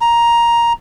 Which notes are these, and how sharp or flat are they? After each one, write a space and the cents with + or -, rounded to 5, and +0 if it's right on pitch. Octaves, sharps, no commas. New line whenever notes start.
A#5 +10